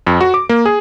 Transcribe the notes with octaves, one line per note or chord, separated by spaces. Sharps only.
F2
F#4
D6
A#3
G#4